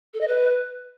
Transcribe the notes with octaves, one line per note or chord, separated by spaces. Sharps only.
A4
D#5
B4